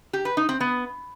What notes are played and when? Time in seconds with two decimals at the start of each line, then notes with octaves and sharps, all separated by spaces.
0.13 G4
0.25 B4
0.37 D#4
0.49 C4
0.60 B3